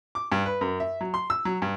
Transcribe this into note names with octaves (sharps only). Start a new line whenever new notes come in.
D6
G2
B4
F#2
E5
F#3
C6
E6
F#3
G2